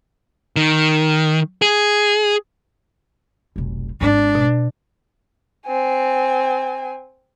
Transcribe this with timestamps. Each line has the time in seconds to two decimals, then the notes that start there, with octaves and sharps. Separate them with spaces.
0.56 D#3
1.62 G#4
3.56 F1 B1
4.01 G#1 G#2 D4
4.35 B2
5.67 C4 G#5